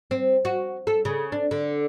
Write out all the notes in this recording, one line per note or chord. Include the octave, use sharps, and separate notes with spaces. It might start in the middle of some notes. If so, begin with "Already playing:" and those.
C4
F#4
A4
C#3
D4
D3